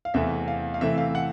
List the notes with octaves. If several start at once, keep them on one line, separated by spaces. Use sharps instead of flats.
F5
E2 C3 E3 A3 E5
F5
F5
C3 E3 A3 C4 E5
F5
F#5